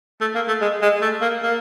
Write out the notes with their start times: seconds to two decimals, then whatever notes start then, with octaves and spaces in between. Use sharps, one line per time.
0.21 A3
0.35 A#3
0.48 A3
0.61 G#3
0.82 G#3
1.02 A3
1.22 A#3
1.42 A#3